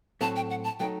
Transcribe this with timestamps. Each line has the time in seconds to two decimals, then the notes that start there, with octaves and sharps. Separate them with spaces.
0.21 A2 F#3 A3 C4 F#4 A5
0.36 G5
0.50 F#5
0.64 A5
0.80 F#3 A3 C4 D#4 G5